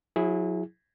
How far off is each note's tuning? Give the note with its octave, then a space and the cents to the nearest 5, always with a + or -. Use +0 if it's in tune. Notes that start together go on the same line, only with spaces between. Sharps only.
F#3 -35 E4 -5 G#4 +0